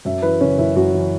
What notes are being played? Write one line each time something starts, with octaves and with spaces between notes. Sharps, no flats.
F#2 E5
E3 B4
F#1 C#4
F#1 E4
F#2 F#4
E3